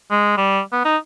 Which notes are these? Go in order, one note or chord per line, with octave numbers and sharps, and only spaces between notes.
G#3
G3
B3
D#4